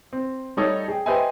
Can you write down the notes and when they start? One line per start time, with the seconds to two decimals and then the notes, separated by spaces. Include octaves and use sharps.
0.13 C4
0.57 G3 A3 D#4 A4 C#5
0.88 G#4 G5
1.06 G4 B4 C5 D#5 E5 G#5